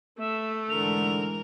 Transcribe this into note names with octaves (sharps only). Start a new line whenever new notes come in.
A3 E5
G#2 D3 E3 A#4 F7